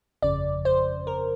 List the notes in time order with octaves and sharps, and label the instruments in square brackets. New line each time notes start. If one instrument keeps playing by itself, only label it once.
[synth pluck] G1 F2 C#3 D5
C5
A#4